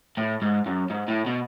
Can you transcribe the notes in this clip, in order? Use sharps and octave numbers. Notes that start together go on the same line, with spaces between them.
A2
G#2
F#2
G#2
A2
B2